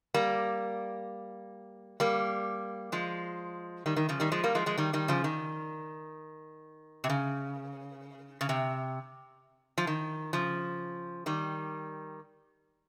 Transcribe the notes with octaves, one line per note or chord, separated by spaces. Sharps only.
G3 A#3
G3 A#3
F3 G#3
D#3 G3
D#3
C#3 F3
D#3 G3
F3 G#3
G3 A#3
F3 G#3
F3 G#3
D#3 G3
D#3 G3
C#3 F3
D#3
C3
C#3
C#3
C3
F3
D#3
C#3 F3
D#3 G3